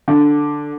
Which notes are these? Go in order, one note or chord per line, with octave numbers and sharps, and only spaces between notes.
D3